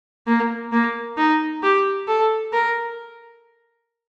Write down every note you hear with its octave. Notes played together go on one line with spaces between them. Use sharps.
A#3
A#3
D#4
G4
A4
A#4